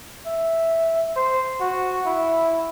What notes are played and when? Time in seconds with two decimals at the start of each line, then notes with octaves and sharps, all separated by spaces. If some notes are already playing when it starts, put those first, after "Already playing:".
0.26 E5
1.16 C5
1.61 F#4
2.06 E4